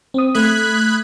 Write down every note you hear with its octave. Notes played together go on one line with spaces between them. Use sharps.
C4 D#6
A3 B5 D#6 F#6 G#6